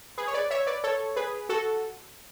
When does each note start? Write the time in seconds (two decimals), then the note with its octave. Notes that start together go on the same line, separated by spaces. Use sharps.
0.18 G#4 B4
0.28 C#5
0.33 B4 D5
0.50 C#5 E5
0.67 B4 D5
0.84 A4 C#5
1.16 G#4 B4
1.49 F#4 A4